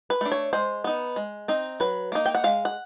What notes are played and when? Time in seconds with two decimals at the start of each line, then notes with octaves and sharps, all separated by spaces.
0.10 B4
0.21 A3 D4
0.32 C#5
0.53 G#3 C5
0.84 B3 D#4
1.16 G#3
1.48 C4 D#4
1.80 F#3 B4
2.12 A#3 D#4
2.26 G5
2.35 F#5
2.44 G#3 F5
2.65 F#5